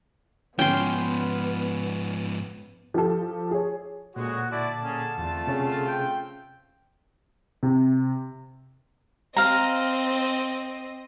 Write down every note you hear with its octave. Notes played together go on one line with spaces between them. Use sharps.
G#2 F3 B3 C#4 G5 C6
F3 G4 A4
G#4 C#5
D2 A#2 C#3 G#3 F#4
D3 E4 F#4 D5 A5
A#3 C#4 G#4
E2 A3 C4 F4
C3 C#4 G#4
G5
C3
C4 D#5 F5 A#5